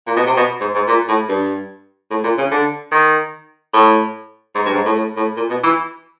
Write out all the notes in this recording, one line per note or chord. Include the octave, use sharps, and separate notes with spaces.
A#2
B2
C3
B2
G#2
G#2
A#2
A2
G2
A2
A#2
C#3
D3
D#3
A2
G#2
G2
G#2
A2
A2
A2
A#2
B2
E3